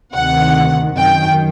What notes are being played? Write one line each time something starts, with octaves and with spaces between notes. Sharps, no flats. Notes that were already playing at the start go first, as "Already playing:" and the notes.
D2 C3 D#3 F#5
F#2 D#3 G5